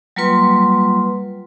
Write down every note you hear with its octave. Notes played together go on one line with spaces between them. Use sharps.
F#3 G3 A#3 F4 B4 C6